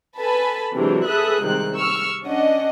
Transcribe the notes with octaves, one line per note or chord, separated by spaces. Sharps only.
A4 B4 G#5 A5 B5
C3 E3 F#3 G#3 D4 F#4
G#4 A4 B4 E5 D#6 F#6
C2 C3 D#3 G#3 C4 F#6
C#6 E6 F6
C#4 D4 D#5 F#5